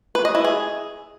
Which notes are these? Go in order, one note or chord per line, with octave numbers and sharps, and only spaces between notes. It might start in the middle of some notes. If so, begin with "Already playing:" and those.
B4
D#5
E4
G#4